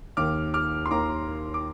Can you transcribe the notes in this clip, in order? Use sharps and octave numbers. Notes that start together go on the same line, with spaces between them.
D#2 D#3 A#3 D6 F6
D6 F6
C6
D#2 D#3 A#3 A#5 D6
D6